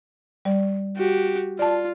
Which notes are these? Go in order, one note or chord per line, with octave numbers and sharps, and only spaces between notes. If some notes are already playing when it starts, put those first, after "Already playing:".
G3 D5
F#4 G4
F4 D5 A5